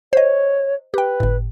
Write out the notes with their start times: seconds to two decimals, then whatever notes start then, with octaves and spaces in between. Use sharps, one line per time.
0.13 C5 C#5 D#5
0.94 G4 B4 G5
1.20 G1 A2